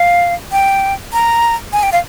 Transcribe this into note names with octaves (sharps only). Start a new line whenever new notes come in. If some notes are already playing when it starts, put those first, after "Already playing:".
Already playing: F5
G5
A#5
G#5
G5
F5